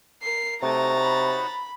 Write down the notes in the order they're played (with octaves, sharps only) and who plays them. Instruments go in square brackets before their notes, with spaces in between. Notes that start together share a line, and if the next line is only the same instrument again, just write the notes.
[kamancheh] A#4 [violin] C7
[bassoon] C3 [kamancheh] A3 [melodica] D#4 F#4 C#5 [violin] A#5 A6
[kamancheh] B5